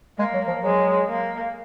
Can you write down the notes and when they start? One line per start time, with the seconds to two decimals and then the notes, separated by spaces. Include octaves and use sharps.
0.18 G#3 A#3
0.34 F#3
0.48 F3
0.64 F#3 G#3
1.08 A#3